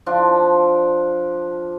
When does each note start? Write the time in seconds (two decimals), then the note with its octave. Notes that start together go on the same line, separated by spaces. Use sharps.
0.06 F3 D4 F4